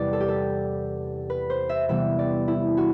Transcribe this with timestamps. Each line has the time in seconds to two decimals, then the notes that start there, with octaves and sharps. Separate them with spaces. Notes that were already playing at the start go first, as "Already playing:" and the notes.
Already playing: E2 C3 G3 C4 B4 D5
0.13 A4
0.20 G4
0.28 A4
1.30 B4
1.50 C5
1.69 E5
1.89 C3 E3 G3 B3 E5
2.19 D5
2.48 E4
2.77 F#4